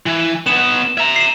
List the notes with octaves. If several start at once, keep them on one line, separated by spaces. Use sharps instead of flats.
E3
B3 D#4 E7
E5 A#5
C7 E7